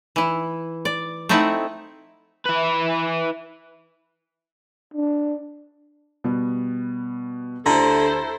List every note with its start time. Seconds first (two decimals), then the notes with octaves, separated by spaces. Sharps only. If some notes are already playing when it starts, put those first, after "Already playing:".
0.16 E3 E4
0.85 D5
1.29 A3 C4 D#4 E4 E5 F#5
2.45 E4 B4
4.94 D4
6.24 B2 G3 B3
7.66 D2 D3 E4 G4 A4 C5 A#5 A#6